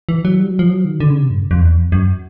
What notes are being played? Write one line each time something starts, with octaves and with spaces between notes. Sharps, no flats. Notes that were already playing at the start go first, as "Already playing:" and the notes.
E3
F#3
G3
F#3
F3
F#3
D#3
D3
C#3
C3
G2
F2
E2
F2
F#2